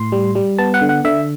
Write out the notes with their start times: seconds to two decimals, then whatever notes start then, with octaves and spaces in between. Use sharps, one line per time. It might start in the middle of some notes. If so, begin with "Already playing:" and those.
Already playing: A2 C6
0.12 G3
0.35 G3
0.58 B3 A5
0.74 F#5
0.82 D3
0.89 F#5
1.05 D3 E5